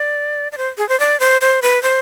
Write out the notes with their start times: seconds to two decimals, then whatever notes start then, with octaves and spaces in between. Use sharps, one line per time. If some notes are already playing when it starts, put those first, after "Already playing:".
Already playing: D5
0.52 D5
0.57 C5
0.78 G#4
0.89 C5
1.00 D5
1.20 C5
1.41 C5
1.62 B4
1.83 C5